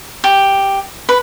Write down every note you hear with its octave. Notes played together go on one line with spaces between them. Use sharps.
G4
B4